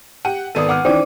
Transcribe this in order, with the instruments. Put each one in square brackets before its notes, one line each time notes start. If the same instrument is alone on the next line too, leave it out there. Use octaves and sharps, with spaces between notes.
[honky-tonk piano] G4 F#5 [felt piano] D#7
[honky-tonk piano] G#1 B3 D#7 [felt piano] A4 D5 D#6
[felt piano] F#5 D6 F6
[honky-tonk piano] D#3 E3 C#4 [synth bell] C5 D5 D6 [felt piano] G5